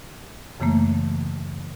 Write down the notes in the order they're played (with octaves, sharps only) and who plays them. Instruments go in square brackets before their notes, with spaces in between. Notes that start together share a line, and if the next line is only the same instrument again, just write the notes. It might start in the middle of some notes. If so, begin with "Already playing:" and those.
[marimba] F#2 C#3 E3 A3 A#3